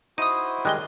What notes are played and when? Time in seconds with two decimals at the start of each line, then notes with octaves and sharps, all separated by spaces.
0.18 D#4 E4 F#4 C5 D#6 D#7
0.65 D#3 G3 G#3 F#6 G7